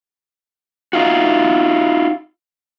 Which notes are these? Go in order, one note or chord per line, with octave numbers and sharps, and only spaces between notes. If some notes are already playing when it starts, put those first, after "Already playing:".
D#4 F4 F#4